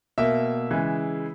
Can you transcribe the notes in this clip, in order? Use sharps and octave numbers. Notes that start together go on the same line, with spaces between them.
B2 A#3 E5
C#3 E3 G#3